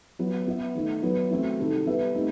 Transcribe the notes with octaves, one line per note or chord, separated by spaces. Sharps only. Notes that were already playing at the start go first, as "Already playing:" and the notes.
F#3 B3 E4
B3 E4 B4 E5
D#3 A3 D#4
F#3 B3 E4 B4
E3 A3 C4 F#4
C3 D#3 G3 D#4 A4
G3 B3 E4 B4 E5
A3 C4 D#4 G4